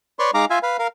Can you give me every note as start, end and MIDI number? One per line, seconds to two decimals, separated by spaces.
0.19 0.31 71
0.19 0.31 73
0.19 0.31 74
0.19 0.31 84
0.19 0.31 85
0.34 0.45 56
0.34 0.45 63
0.34 0.45 77
0.34 0.45 82
0.34 0.45 86
0.50 0.59 65
0.50 0.59 76
0.50 0.59 77
0.50 0.59 80
0.63 0.77 71
0.63 0.77 77
0.79 0.87 70
0.79 0.87 77